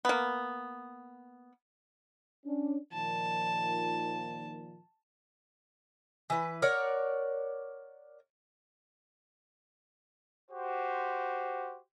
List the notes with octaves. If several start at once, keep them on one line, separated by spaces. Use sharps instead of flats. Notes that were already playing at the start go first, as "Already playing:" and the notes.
A#3 B3
C#4 D4
A#2 D#3 F3 A5
E3 B4
A#4 C#5 D5 F#5
F#4 G4 C5